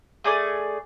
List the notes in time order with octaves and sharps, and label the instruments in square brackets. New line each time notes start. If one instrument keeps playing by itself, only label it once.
[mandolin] A3 G#4 D5 G#5